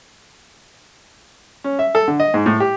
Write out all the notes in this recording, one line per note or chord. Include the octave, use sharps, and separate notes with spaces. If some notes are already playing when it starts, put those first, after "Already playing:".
C#4
E5
A4
D3
D#5
G#2
A2
G4